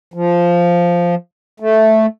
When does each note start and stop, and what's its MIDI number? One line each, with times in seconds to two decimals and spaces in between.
0.14 1.15 53
1.60 2.06 57